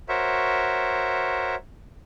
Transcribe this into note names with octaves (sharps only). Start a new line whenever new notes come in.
F#4 A#4 C5 C#5 E5